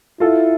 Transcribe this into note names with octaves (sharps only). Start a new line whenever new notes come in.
E4 F4 A4